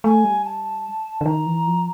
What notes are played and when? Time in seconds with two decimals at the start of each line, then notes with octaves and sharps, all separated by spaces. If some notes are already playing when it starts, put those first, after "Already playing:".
0.04 A3 G#5
0.24 G3
0.45 A5
1.21 D3
1.26 D#3 A#5
1.46 E3
1.67 F3